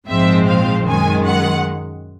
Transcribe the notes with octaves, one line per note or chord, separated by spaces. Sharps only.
A#1 G#2 F3 G#3 C4 E5
F5
F#2 D#3 G#3 G#5
F#5